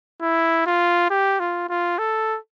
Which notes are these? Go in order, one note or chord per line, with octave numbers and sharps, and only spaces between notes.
E4
F4
G4
F4
F4
A4